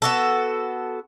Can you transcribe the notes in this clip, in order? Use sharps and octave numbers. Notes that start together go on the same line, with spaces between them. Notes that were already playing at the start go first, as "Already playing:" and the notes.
B3 F#4 A4